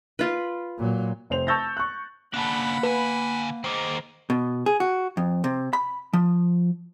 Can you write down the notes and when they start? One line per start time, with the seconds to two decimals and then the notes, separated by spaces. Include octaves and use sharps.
0.19 F4 B4
0.78 A#2 F#3
1.30 F1 C5 F7
1.47 A5 C#6 E6 G6 A6 A#6
1.77 C#6 F#6
2.34 C#3 A#3 D4 F#5 A5 B5
2.83 D3 B4 G#5
3.64 D#3 A#3 C5 D#5
4.30 B2
4.66 G#4
4.80 F#4
5.17 F2
5.44 C3
5.73 B5
6.13 F3